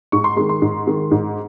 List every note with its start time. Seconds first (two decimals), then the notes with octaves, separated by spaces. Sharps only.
0.12 G#2 C#6
0.24 C6
0.37 D#3 G#3 C6
0.49 C6
0.62 G#2
0.87 D#3 G#3
1.11 G#2